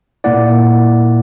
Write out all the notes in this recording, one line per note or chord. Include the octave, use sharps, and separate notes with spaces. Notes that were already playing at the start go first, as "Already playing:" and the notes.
A#2 A#3 E4 D5 F#5